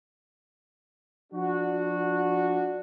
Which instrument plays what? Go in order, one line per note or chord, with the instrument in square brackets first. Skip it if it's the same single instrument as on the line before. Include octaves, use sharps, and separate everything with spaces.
[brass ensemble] F3 D4 F#4